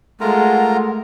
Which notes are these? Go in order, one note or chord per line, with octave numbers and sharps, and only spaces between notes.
G#3 A3 F4 A#4 F#5 A#5